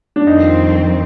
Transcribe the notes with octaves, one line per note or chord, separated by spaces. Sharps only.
D4
F2 D#3 G3 C4 D#4